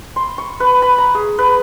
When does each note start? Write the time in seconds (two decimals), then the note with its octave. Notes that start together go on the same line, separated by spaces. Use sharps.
0.16 C6
0.38 C#6
0.60 B4
0.82 B5
0.98 A#5
1.15 G#4
1.38 B4